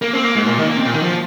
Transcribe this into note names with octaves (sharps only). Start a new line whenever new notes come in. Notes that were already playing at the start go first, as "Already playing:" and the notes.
A#3
C4
A#3
G#2
A#2
D#3
A#3
C4
A#2
D#3
F3